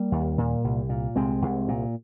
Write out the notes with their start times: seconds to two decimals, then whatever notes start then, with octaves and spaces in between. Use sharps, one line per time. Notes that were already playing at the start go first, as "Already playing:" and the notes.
Already playing: G3 A#3
0.12 D#2
0.38 A#2
0.64 C2
0.89 A#2
1.16 C2 G#3 C4
1.42 C2
1.68 A#2